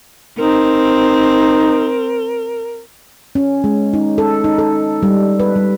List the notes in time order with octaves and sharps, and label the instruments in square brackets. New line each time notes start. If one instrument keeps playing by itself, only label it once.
[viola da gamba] C4 [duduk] D#4 [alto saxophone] A#4
[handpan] C#4
G#3
D#4
A4
D#4
A4
G3
B4
G3